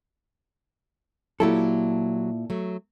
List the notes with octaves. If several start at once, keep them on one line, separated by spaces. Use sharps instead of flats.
A#2 F#3 E4 G4 A4
F#3 A3